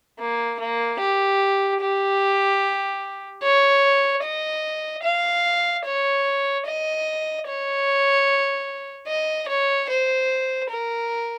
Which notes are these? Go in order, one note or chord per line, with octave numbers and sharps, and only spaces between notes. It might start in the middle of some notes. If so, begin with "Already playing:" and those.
A#3
A#3
G4
G4
C#5
D#5
F5
C#5
D#5
C#5
D#5
C#5
C5
A#4